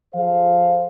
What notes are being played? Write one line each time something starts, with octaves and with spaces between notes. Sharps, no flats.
F3 G#4 A4 C5 F5